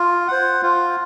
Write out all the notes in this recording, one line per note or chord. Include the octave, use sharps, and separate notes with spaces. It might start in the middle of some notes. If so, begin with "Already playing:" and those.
Already playing: F4
C5 F#5
F4